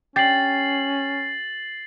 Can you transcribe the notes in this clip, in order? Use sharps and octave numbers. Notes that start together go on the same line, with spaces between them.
C#4 G4 A6 C7 F#7